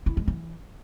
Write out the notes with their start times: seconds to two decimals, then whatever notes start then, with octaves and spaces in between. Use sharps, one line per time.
0.06 E4
0.17 G#3
0.28 E3